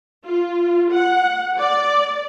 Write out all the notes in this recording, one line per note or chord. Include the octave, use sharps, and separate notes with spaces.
F4
F#5
D5